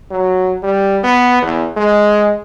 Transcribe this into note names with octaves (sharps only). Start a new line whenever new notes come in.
F#3
G3
B3
E2
G#3